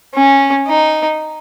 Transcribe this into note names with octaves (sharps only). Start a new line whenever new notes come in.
C#4
D#4